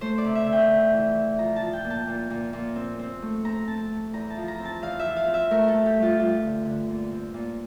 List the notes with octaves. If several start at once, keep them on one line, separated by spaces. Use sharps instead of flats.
A3 C5
D5
C3
E5
C3
G5
C3
E3
E3
F3 A#5
A5
F3
G5
A#2
A5
A#2
A#2
A#2
C4
C4
A3
C4 A#5
C4 A5
A3
E2 A#5
A5
F3
A#5
C4
A5
E2 F5
E5
F3
F5
C4
E5
A3 A#4
A4
A3
G4
G2
F4
G2 F4
D3
D3
A#2
C4
A#2